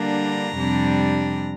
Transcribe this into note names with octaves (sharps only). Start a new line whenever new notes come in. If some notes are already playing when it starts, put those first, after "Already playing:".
Already playing: D3 G3 A#3 D4 A#5
F2 C3 G3 D4